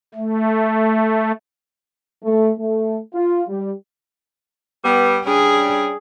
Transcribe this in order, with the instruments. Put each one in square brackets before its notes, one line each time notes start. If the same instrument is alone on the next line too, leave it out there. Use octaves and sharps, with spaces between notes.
[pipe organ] A3
[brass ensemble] A3
A3
F4
G3
[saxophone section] G3 B3
[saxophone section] G3 C#4 D4 [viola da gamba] G#4